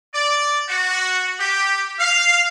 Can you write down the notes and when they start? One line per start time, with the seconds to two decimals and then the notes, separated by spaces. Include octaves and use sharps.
0.14 D5
0.68 F#4
1.39 G4
1.99 F5